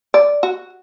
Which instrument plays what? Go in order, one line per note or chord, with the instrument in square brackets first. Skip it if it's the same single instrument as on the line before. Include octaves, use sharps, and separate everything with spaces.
[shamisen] D5
F#4